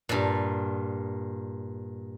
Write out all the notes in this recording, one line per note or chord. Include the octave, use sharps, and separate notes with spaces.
G2 A#2